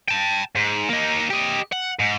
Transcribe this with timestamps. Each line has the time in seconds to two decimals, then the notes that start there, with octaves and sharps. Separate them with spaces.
0.08 G5 A5
0.56 G#2
0.90 A#3 D#4
1.30 G4 D#5
1.72 F#5
1.99 G#2